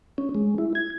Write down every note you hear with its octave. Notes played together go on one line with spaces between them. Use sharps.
C#4
G#3
E4
G#6